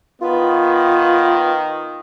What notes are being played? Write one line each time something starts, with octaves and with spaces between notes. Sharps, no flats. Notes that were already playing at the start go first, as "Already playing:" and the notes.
D#3 B3 F4